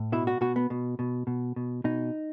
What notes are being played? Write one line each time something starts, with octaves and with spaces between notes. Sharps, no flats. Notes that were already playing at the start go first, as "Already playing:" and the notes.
Already playing: A2
B2 E4
F#4
B2 F#4
B3
B2
B2
B2
B2
B2 D#4